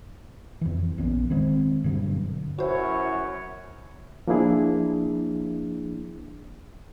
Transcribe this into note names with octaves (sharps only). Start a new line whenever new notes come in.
F2 E3
A#1 B3 C#4
D#3 G#3 C4
G2 B2 D3 F#3
F#2 E4 F#4 C5 C#5
F3 A#3 D4 E4 G#4